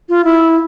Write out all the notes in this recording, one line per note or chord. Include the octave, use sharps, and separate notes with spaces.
F4
E4